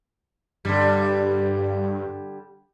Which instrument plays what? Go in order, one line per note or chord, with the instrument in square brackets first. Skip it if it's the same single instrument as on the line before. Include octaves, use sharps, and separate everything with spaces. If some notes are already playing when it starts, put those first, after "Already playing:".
[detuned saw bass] G2 [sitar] D3 G3